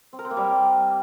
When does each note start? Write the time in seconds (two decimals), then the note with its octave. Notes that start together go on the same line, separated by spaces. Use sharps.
0.13 C4
0.19 A#4
0.25 C4
0.31 A#3
0.37 G3